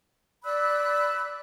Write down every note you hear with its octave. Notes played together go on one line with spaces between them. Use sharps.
D5 B5 E6 F#6